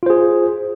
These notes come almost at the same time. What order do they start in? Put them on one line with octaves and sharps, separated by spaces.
F4 C5 G#4